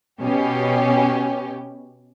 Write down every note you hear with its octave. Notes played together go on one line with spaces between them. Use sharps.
B2 C#4 G4